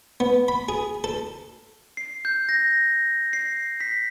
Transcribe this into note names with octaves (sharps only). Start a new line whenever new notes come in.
B3
B5
G#4
A4
C7
G6
A#6
C7
B6